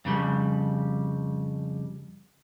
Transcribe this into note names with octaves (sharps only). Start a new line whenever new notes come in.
F2 C#3 G3